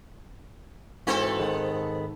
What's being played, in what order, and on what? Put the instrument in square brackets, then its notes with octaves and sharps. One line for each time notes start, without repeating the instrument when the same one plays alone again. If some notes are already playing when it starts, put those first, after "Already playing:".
[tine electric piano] G#2 E3 F#4 [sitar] B3 C4 A4
[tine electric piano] G#2 D#3 G#3